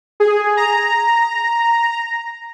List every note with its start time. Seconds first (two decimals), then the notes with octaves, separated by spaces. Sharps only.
0.20 G#4
0.57 A#5